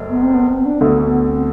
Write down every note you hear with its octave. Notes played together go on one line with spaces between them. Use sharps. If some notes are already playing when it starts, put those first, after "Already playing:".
Already playing: F#1 F#2 A3
B3
C4
B3
C4
D4
D2 D3 A3 B3
B3
C4